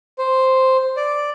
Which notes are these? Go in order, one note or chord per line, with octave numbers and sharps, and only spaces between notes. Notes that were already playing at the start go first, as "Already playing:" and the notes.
C5
D5